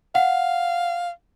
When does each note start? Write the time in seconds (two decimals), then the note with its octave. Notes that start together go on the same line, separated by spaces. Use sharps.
0.15 F5 F#5